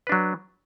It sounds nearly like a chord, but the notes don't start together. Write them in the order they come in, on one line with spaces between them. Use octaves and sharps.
B4 D4 F#3